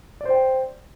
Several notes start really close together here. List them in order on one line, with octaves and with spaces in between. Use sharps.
D5 C5 G5